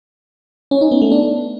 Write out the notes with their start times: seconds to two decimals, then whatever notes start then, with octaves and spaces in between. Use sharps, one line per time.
0.71 C#4
0.81 D#4
0.91 B3
1.02 A3
1.12 D4